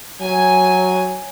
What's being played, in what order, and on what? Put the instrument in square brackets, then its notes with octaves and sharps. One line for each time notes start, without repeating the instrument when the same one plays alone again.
[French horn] F#3 [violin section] G#5